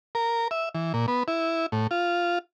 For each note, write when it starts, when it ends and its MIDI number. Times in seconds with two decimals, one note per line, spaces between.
0.15 0.48 70
0.51 0.69 76
0.75 0.93 52
0.94 1.06 46
1.08 1.23 59
1.28 1.66 64
1.72 1.87 45
1.91 2.39 65